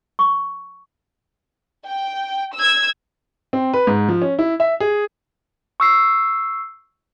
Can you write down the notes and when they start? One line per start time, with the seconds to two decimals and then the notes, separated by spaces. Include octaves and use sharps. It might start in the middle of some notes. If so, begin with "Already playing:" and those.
0.19 C#6
1.86 G5
2.55 E6 G#6
3.53 C4
3.74 B4
3.87 G#2
4.08 F3
4.22 C#4
4.39 E4
4.60 E5
4.80 G#4
5.80 C#6 E6 C7